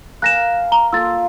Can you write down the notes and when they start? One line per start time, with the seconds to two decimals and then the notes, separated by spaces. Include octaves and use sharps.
0.22 A#4 F5 G#5 F#6 A#6 E7
0.72 A#5 G7
0.93 A#3 F4 A4 E6 A6